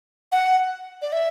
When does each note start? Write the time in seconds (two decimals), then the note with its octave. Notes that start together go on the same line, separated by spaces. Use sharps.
0.32 F#5
1.02 D5
1.12 E5